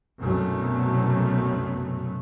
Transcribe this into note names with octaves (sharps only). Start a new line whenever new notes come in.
C2 F#2 B2 A3 B3